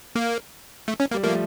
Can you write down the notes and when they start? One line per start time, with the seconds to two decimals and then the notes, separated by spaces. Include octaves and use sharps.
0.16 A#3
0.88 A3
1.00 C#4
1.11 G3 A#3
1.23 F3 A3 A#3